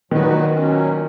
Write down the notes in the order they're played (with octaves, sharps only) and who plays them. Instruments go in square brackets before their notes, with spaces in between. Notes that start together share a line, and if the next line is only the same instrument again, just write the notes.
[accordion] A#2 F#3 B3 F#4 B4 [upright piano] D#3
[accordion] A#2 F#3 C#4